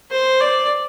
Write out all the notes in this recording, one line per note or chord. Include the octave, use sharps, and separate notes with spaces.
C5
D5